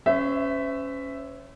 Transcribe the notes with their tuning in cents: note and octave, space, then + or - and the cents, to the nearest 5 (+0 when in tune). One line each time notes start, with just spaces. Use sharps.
C#4 +0 C5 -45 E5 +0